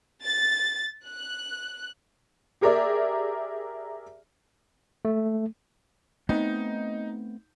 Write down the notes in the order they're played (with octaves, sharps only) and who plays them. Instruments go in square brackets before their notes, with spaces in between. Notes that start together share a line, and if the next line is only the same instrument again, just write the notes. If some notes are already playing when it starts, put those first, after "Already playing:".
[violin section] A6
F#6
[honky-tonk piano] G4 G#4 A#4 D5 E5
[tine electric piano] A3
[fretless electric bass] A3 B3 C4 [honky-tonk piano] D#4